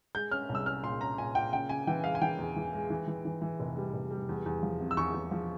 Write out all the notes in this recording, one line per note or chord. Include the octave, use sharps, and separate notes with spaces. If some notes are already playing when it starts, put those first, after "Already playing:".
G#3 G6
C#4 F6
C2
E6
C#4 F6
A#2 C6
C#4 A#5
A#2 G#5
A#2 G5
C#3 G5
C#3 G#5
E3 G5
G#3 F5
G#5
E3 G5
E2
E3
G#3
E3
E3
E3
E3
F1
G3
F1
G3
E2
E2
F3
C3
E6
E2 C#6
E2
F3